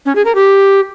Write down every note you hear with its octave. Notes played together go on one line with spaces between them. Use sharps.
C#4
G#4
A#4
G4